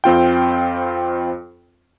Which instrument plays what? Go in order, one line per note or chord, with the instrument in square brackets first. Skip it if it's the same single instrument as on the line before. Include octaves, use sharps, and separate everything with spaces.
[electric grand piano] F2 C4 F4 G5